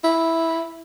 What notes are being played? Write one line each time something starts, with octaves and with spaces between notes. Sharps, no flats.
E4